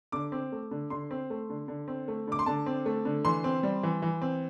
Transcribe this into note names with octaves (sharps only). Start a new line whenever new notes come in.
D3 D6
C4
A3
D3
D3 C6
C4
A3
D3
D3
C4
A3
D3 D6
C6
D3 A5
C4
A3
D3
E3 C6
C4
G3
E3
E3
C4